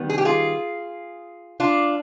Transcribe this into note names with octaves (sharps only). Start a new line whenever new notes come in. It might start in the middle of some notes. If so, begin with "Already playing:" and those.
Already playing: D#3 G3 B3
G#4
G4
F4 G#4
D4 F4